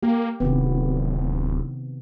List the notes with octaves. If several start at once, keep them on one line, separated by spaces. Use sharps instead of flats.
A#3 G4
D1 C3 D#3 B3